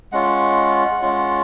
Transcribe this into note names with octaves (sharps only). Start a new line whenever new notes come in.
G#3 C#4 F4 F#5
G#3 C#4 F4